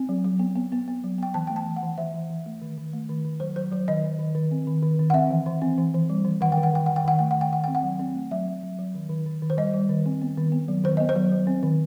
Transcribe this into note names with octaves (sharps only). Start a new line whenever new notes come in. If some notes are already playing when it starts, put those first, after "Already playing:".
Already playing: C4
F#3
F#3
B3
B3
B3
B3
F#3
B3 G5
E3 A5
A3 G5
A5
E3
F#5
E3
E3 E5
E3
E3
A3
D#3
D#3
A3
D#3
D#3
F#3 C5
F#3 C5
F#3 C5
D#3 D#5
D#3
D#3
D#3
C4
D#3
D#3
D#3
F#5
C4 E5
E3
E3
C4
E3
E3
G3
E3
D#3 F#5
G5
D#3
F#5
D#3 G5
D#3 F#5
G5
D#3 F#5
A3 G5
F#5
D#3 G5
D#3 F#5
C4 G5
F#5
F#3
C4
A3
F#3 E5
F#3
F#3
F#3
D#3
D#3
D#3
D#3
C5
G3 D#5
G3
D#3
C4
B3
D#3
B3
F#3
D#3 C5
B3 D#5
C5
F#3
F#3
C4
D#3